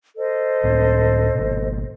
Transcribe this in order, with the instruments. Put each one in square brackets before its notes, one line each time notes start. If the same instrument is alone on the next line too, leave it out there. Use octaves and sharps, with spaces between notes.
[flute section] A4 C5 D#5
[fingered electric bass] C#2 A2 C4
G#1 B2